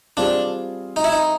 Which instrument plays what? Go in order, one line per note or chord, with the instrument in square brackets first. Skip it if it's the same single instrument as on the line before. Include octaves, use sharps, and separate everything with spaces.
[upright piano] G3 C4 F4 G#4 [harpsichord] D4
[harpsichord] D#4
E4
D#4